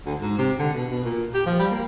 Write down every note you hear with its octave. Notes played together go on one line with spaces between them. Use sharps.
D2
G#2
C3
D3
B2
B2
A#2
G4
F3
G3
A#3